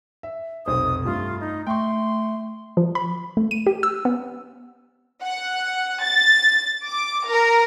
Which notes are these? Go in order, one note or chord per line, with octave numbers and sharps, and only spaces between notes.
E5
F1 B1 C5 D#6
G2 A3 F4
D#4
A3 G5 C6 C#6
F3
B5
A3
D#7
G4
E6
B3
F#5
A6
D6
A#4